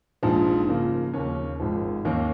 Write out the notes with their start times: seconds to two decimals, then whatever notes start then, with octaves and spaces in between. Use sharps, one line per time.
0.23 A#1 G#2 F3
0.68 C#3 F3 A#3
1.14 D#2 C#3 A#3 C#4
1.60 G#1 G#2 F3
2.05 D#2 D#3 A#3 C#4